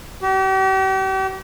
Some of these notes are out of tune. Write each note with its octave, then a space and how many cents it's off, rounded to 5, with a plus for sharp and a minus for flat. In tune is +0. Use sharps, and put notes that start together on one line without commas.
G4 -40